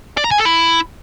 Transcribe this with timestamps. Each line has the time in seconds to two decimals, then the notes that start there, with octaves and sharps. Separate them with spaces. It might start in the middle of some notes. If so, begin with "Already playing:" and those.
0.17 D5
0.24 A#5
0.31 G#5
0.38 A4
0.45 E4